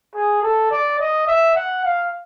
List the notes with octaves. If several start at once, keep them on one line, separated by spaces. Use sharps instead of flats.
G#4
A4
D5
D#5
E5
F#5
F5